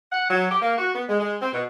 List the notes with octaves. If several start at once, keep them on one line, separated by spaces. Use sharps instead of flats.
F#5
F#3
G4
A#3
F#4
B3
G#3
G#3
C4
B2